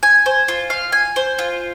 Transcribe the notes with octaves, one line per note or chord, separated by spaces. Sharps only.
G#5
C5
F4
F5
G#5
C5
F4